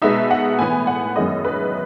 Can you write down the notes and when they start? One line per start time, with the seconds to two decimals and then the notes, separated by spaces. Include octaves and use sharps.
0.02 B2 G#3 B3 D#4 E5
0.31 F#5
0.59 A2 E3 B3 G#5
0.87 F#5
1.16 F#2 D#3 G#3 B3 E4 D#5
1.45 B4